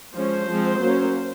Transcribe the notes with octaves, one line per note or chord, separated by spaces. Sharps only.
F3 G#3 C#4 C5
F3 G#3 C4
F#3 A#3 C#4